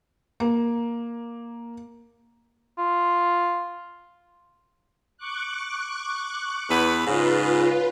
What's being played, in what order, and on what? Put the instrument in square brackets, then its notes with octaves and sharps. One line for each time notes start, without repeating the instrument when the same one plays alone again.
[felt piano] A#3
[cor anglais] F4
[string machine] C#6 D6 F#6
[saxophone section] E2 B4
[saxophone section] G#2 C#3 [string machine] F4 B4